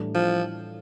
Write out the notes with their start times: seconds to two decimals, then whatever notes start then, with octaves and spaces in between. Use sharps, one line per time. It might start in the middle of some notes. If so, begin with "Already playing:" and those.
Already playing: A2 E3 G3 D4
0.14 F3